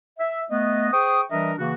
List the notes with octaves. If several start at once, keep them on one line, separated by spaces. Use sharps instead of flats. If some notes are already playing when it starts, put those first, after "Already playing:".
E5
A3 B3 D#5
G#4 C5 G5 C#6 D#6
E3 G3 D4 A#4 D#5 E5
C#3 E3 A#3 F#4